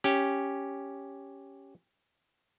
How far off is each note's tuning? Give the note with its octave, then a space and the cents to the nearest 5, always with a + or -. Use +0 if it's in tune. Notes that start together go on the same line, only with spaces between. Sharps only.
C#4 +0 G4 +0